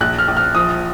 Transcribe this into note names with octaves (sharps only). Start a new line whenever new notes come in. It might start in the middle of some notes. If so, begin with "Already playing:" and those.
A#1 F#6
F6
A#1
F6
F3 D#6